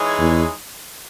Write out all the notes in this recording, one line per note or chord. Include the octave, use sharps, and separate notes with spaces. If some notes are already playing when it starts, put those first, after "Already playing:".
Already playing: E3 G#3 D#4 G#4 C#5
E2